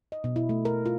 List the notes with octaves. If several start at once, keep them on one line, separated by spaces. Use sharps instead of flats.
D#5
B2
E4
A3
A#4
F4